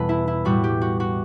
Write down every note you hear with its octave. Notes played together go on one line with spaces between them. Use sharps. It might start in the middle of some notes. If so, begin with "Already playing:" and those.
Already playing: E2 B2 G3 A4 B4
E4
E4
A2 G3 F#4
G4
F#4
F#4